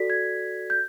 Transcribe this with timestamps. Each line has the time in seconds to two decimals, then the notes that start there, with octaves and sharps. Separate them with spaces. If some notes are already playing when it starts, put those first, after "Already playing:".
Already playing: F#4 A4 D5 B6
0.10 G#6
0.70 G6